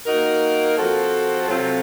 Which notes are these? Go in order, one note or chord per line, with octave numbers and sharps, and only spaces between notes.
A#3 D#4 F#4 A#4
F3 C4 F#4 A4
C3 F#3 C4 F4 A4